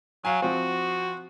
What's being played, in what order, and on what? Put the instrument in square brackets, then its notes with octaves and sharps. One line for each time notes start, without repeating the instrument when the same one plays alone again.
[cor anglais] F#3 [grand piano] F5 G#5
[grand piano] F3 C4 [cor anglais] F#4